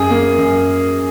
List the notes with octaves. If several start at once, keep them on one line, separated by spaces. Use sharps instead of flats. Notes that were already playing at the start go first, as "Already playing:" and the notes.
Already playing: F#2 G#4
A#3
F#2